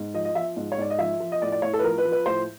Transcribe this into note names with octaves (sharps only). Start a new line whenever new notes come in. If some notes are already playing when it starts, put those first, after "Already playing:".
Already playing: G#2
F3 D#5
D#5
F3 E5
G#2
C#5
G#2 D5
D#5
F3 E5
F3
D#5
A2 D5
D5
A2 C#5
A4
B4
F3 A#4
B4
F3
B4
A2 C5